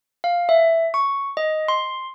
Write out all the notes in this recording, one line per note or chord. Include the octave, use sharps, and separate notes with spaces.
F5
E5
C#6
D#5
C6